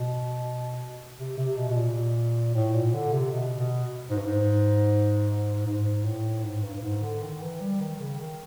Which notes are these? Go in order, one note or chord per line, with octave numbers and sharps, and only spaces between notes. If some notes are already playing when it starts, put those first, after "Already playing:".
Already playing: B2
C3
C3
B2
B2
A#2
A2
A#2
D3
C3
B2
B2
G#2
G2
G#2
G#2
A2
G#2
G2
G2
G#2
D3
D#3
E3
G3
D#3
C#3
D#3